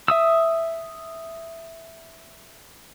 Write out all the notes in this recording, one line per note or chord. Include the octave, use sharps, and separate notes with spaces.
E5 D#6 E6